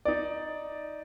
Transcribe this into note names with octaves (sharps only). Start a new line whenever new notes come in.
D#4 D5